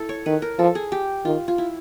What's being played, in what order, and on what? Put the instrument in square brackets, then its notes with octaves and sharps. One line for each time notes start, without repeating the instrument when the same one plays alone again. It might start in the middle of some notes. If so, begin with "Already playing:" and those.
Already playing: [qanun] E4 A4
C#5
[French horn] D#3 [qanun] B4
[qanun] A#4
[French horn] F3 [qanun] A4
[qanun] G#4
G4
[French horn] D#3 [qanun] F4
[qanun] F4
E4